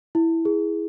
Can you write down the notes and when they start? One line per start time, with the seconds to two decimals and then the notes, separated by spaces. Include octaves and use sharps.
0.15 E4
0.45 G#4